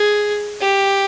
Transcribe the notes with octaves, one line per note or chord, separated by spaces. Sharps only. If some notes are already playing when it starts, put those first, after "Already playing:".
Already playing: G#4
G4